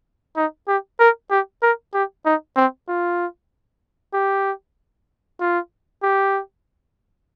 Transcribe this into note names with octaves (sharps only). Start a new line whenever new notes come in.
D#4
G4
A#4
G4
A#4
G4
D#4
C4
F4
G4
F4
G4